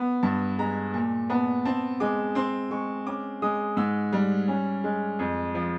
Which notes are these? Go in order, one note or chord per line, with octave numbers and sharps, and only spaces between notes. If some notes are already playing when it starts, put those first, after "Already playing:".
Already playing: B3
G2 A5
G#3 A#5
A#2 A5
B3 A5
C4 A5
G#3 D6
C4 C6
G#3 C#6
C#4 D6
G#3 D#6
G#2 E6
G3
C#4
G#3
F2
F3